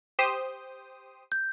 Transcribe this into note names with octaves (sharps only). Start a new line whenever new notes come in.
G4 C5 D#6
G6